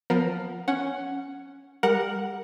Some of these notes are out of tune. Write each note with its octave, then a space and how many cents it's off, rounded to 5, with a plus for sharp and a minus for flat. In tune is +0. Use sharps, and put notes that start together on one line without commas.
F3 +20 B3 +0 A#4 +0
C#4 +0 F#5 +5
G3 +25 A#4 +0 F#5 -5